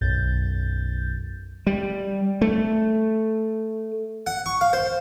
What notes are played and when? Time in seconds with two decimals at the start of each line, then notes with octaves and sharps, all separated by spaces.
0.01 B1 F#2 G6 A6
1.67 G3
2.41 A3
4.27 F#5
4.46 C#6
4.61 F5
4.73 C5